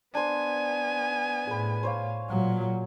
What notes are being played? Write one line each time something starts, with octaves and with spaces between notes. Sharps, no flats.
B3 D4 C5 G#5
A2 G#4 B4
C5 C#5 F5
A#2 F#3